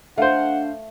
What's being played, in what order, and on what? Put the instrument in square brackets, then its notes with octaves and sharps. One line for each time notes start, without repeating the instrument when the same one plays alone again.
[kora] A3 [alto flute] D4 [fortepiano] C5 F5 [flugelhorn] F#5